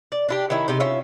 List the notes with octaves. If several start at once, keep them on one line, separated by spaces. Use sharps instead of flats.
D5
D4 E4 G4
D#3 C#4 E4
C3 D#4 G4
C#4 F4 E5